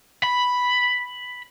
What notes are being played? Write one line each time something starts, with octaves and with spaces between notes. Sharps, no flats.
B5